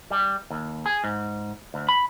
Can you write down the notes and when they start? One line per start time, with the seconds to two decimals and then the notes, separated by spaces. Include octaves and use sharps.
0.11 G3
0.50 D#2
0.86 G#4
1.04 G#2
1.74 D2
1.89 B5